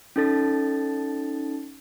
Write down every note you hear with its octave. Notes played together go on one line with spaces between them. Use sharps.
C#4 D#4 A4 A6